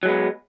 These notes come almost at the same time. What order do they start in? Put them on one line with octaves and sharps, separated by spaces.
F#3 G#3 B3